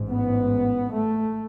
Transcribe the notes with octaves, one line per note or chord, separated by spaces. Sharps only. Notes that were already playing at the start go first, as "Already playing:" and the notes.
Already playing: A1 G#2
B3
A3